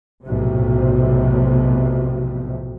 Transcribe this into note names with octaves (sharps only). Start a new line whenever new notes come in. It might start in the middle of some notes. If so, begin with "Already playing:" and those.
B1 F2 A2 C3